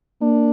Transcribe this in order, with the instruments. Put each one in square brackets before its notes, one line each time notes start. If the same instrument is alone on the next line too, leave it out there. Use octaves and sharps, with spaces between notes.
[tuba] A#3 [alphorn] D4